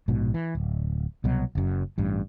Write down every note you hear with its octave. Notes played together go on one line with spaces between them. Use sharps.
A#1 G#2 B2
E3
D1
C2 B2 F#3
F#1 F#2
A1 G2